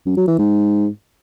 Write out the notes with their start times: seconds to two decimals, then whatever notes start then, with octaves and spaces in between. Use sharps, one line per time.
0.06 F#2
0.17 F#3
0.28 E3
0.38 G#2